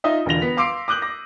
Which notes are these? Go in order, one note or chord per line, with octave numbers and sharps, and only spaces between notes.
D#4 F4 D#5 E5
E1 D3 F4 A#6 F7
B3 B6
F5 C6 D6 E6 C7 D7
D6 D#6 F#6 G6 F#7
D6 A#6